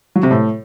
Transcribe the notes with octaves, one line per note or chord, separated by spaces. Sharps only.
F#3
C3
A2